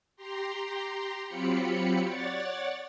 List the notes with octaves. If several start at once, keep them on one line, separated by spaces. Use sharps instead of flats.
G4 A#5 C6
F#3 C4 F4 G4 B5 C#7
C#5 D5 F#5 A6